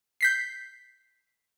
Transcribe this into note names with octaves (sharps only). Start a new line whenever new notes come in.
G6 B6 C7